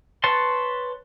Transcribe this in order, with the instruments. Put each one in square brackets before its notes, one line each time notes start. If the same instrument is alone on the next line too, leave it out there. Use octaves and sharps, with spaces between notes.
[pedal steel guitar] B4 C#5 A5 C6